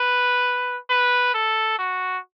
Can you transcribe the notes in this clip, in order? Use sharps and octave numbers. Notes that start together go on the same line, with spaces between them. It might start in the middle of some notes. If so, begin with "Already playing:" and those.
Already playing: B4
B4
A4
F#4